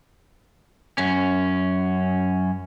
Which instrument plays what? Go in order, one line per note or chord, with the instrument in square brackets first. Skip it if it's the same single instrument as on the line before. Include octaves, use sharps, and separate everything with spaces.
[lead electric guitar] F#2 C#4